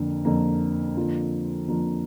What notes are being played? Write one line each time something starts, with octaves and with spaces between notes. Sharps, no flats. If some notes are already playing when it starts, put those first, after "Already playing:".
Already playing: F2 D3 A#3
F2 D3 A#3
F2 D3 F3 A#3 F4
F2 D3 F3 A#3 F4